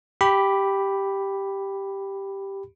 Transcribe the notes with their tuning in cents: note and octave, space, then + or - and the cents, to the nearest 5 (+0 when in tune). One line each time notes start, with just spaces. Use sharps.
G4 +0 B5 +0